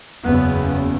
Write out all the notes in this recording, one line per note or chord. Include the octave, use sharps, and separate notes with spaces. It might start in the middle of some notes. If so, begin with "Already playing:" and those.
F#1 E2 C#3 B3